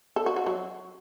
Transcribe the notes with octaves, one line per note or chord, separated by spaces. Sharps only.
A4
F#4
F#4
F#3